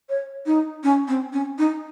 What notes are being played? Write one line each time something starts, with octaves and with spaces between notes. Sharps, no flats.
C#5
D#4
C#4
C4
C#4
D#4